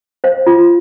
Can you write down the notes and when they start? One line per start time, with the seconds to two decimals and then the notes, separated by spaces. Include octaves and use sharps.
0.24 C5 F5
0.47 F4